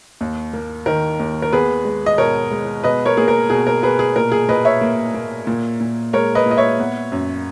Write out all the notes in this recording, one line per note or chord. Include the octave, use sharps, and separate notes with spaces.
D#2
A#3
D#3 A#4
D#2
A#4
B3 G#4 B4
G#3
D#5
B2 A#4 C#5
G#3
B2 B4 D#5
A#4 C#5
A#3 G#4
A#4
B2 G#4
A#4
B2 G#4 B4
G#4
A#2 A#4
G#4
A#2 B4 D#5
C#5 E5
A#3
A#3
A#2
A#2
G#3 A#4 C#5
B4 D#5
A#2
D#5
C#5 E5
B3
F#2